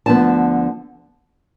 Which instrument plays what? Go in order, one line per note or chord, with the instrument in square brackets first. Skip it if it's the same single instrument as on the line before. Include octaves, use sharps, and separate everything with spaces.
[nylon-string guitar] D2 D3 F3 B3 A5